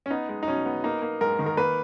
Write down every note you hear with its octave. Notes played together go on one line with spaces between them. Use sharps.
C#4
B3 D#4
G#3
D#4
B2 C#4
B3
A#3 D#4
A#3
G#2 A#4
D#3
A#4
A#3 B4